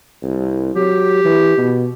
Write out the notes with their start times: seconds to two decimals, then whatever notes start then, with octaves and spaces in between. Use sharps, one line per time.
0.23 C2
0.76 F#3 G4
1.25 E3
1.57 B2